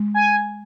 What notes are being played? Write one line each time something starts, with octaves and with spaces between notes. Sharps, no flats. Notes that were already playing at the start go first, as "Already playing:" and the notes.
Already playing: G#3
G#5